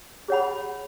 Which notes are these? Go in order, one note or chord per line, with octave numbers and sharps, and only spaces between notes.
G#4 C#5 F#5 B5